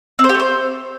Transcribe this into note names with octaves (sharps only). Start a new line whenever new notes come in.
C4
C5
G4
A3
C5